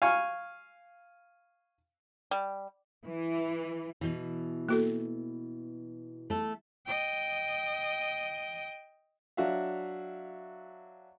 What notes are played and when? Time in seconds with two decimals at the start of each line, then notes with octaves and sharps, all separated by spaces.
0.02 F5 G#5 C#6
2.31 G3
3.06 E3
4.01 B2 E3
4.69 A#3 F#4 A4
6.30 A3 A4
6.86 D#5 G5
9.37 F#3 D4 F#4 E5 F5